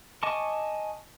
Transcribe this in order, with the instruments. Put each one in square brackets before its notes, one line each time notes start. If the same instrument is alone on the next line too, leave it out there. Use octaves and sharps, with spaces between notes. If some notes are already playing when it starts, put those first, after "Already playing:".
[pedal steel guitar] D#5 G#5 A5 C#6 D6